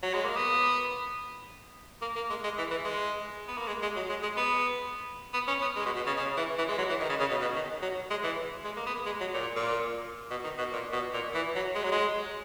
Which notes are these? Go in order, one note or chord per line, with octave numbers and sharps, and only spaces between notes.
F#3
G#3
A#3
B3
A#3
A#3
G#3
G#3
E3
E3
G#3
B3
A#3
G#3
G#3
F#3
G#3
G#3
B3
B3
C#4
B3
G#3
B2
B2
C#3
C#3
E3
E3
G#3
F#3
E3
D#3
C#3
C#3
B2
B2
D#3
F#3
G#3
E3
G#3
A#3
B3
G#3
F#3
A#2
A#2
B2
D#3
B2
A#2
B2
A#2
E3
F#3
G#3
F#3
G#3